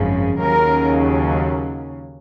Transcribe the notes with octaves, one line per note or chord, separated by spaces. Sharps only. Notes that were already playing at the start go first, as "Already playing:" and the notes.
Already playing: G#1 F#2 C#3 F3
D#2 C#3 F#3 A#4